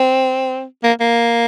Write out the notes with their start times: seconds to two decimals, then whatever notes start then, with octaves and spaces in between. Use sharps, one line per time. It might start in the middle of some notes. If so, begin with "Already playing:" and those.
Already playing: C4
0.84 A#3
1.00 A#3